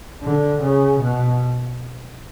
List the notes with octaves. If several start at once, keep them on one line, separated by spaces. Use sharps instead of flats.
D3
C#3
B2